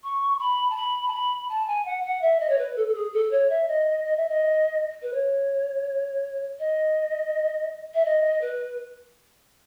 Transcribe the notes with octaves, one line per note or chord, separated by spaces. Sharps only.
C#6
B5
A5
B5
A5
B5
A5
G#5
F#5
F#5
E5
D#5
C#5
B4
A4
A4
G#4
A4
C#5
E5
D#5
D#5
E5
D#5
B4
C#5
D#5
E5
D#5
B4